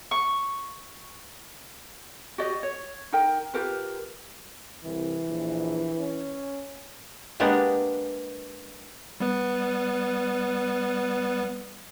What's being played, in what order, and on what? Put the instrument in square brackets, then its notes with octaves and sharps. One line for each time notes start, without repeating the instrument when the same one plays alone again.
[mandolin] C#6
[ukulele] F#4 G4 D5 D#5
C#5
D#4 A#4 G5
F4 G4 A#4 B4
[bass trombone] C2 [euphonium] E3
[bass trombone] A#1
C#4
[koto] G#3 A#3 B3 D4 G4
[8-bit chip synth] G3 B3 B4